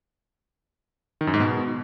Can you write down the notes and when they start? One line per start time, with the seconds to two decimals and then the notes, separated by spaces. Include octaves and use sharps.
1.21 D#3
1.27 F#2
1.34 G#2
1.40 B2